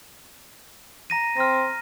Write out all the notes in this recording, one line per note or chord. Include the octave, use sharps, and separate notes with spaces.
A#5 A#6 D#7
C4 F6 A#6